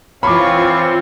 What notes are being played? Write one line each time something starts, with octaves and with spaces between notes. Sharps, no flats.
E3 C4 F4 C#5 F5 B5 C#6 D6